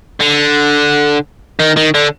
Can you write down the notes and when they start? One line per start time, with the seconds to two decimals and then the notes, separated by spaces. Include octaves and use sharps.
0.21 D3
1.59 D#3
1.77 D#3
1.95 D3